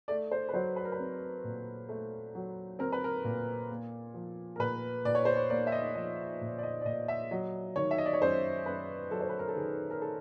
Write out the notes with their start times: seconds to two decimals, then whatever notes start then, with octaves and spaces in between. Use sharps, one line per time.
0.08 A3 D5
0.31 C5
0.49 B4
0.53 F#3 C5
0.76 B4
0.85 A#4
0.92 B4
0.99 C4
1.44 A#2
1.89 A3
2.35 F#3
2.79 C4 A#4
2.92 B4
3.04 A#4
3.24 A#2
3.70 A#3
4.14 F3
4.56 A#4
4.59 A#2 B4
5.05 A#2 D5
5.15 C#5
5.25 C5
5.36 C#5
5.50 A#3 D5
5.67 E5
5.72 D#5
5.95 F3 D#5
6.41 A#2
6.58 D5
6.63 D#5
6.81 D5
6.85 A#2 D#5
7.08 E5
7.31 F#3 D#5
7.76 D#3 C#5
7.91 E5
7.98 D#5
8.06 D5
8.13 C#5
8.21 F#2 C5
8.66 F#2 B4
9.11 F#3 A4
9.21 C5
9.29 B4
9.39 A#4
9.48 A4
9.56 D#3 G#4
9.91 A#4
10.02 A4